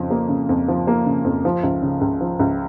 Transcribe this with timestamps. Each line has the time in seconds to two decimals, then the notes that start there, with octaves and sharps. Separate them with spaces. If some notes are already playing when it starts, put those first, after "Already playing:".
Already playing: F2 C#3 F3
0.10 A#3
0.29 C#3
0.49 F2
0.68 F3
0.87 A#3
1.06 C#3
1.25 F2
1.45 F3
1.63 C#2
1.82 C#3
2.01 C#2
2.21 F3
2.39 C#2